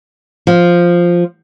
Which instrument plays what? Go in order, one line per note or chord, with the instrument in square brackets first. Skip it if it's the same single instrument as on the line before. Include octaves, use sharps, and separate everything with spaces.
[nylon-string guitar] F3